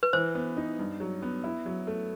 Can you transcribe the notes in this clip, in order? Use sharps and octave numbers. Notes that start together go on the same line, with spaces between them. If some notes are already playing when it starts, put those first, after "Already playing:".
B4
E3 C5
B3
D#4
G2
F#3
B3
E4
F#3
A3